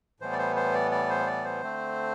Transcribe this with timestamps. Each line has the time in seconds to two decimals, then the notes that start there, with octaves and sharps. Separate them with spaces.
0.20 A2 E3 G3 B3 C5
0.33 D5
0.38 C5
0.56 C5
0.74 D5
0.91 D5
1.10 C5
1.27 D5
1.45 C5
1.62 D3 A3 C4